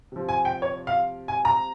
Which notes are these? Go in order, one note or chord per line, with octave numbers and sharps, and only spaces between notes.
C3 F3
G#5
G5
C#5
F5
G#5
A#5